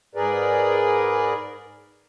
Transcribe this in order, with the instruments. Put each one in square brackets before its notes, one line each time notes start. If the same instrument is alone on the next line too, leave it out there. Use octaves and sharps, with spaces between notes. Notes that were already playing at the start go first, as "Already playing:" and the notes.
[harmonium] G#2 G#4 A#4 B4 D5